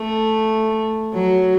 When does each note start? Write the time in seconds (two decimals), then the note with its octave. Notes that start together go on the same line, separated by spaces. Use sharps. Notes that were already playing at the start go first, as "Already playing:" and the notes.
Already playing: A3
1.14 F#3